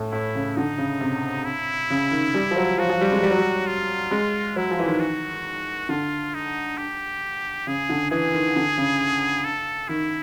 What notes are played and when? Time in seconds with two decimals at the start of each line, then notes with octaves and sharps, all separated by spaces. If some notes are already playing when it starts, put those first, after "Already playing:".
Already playing: A2
0.12 A2 E4
0.35 C#3
0.56 D3 D#4
0.78 C#3
1.01 C3
1.45 E4
1.90 C#3
2.11 D#3
2.34 G3
2.51 F3
2.57 F#3
2.78 F3 F#4
2.90 F3
3.01 G3
3.12 G#3
3.23 G3
3.31 F#3
3.39 G3
3.67 F4
4.11 G#3
4.56 F#3 E4
4.71 F3
4.79 E3
4.86 D#3
5.00 F#4
5.89 D3 F4
6.34 D#4
6.78 G4
7.67 C#3 G#4
7.90 D3
8.11 E3 G#4
8.33 D#3
8.56 D3
8.78 C#3
9.44 A4
9.89 D#3 E4